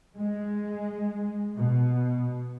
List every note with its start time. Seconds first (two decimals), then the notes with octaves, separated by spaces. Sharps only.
0.17 G#3
1.56 B2